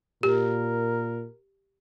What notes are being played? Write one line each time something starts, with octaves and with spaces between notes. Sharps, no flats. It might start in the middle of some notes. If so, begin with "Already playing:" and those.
A#2 G4 A#4